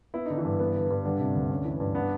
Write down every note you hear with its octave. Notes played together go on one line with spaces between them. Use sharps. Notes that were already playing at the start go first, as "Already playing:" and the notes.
B3 E4
D3 D#4
E3 E4
G2
B3
D3
G2
D3 G3 D4
C3
D2
C#4
E3
G2
B3 D4